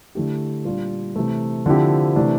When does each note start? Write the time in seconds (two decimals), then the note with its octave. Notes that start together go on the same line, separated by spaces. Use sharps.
0.15 D3 A3 E4 G4
0.65 A#2 G3 D4 F4
1.16 C3 E3 A3
1.66 D3 F3 C4 E4 G4
2.16 C3 E3 A3 D4